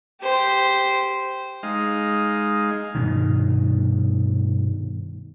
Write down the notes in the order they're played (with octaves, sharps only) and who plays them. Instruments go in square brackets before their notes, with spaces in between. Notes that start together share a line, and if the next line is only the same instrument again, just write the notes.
[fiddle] G4 C5
[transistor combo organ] G#3 D#4 F5
[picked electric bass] G2 B2 D#3